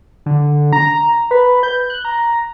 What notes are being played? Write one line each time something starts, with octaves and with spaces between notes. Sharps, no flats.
D3
A#5
B4
G6
F#6
A#5